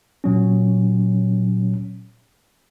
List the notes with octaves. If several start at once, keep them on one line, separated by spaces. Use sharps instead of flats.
A#2 F#3 C#4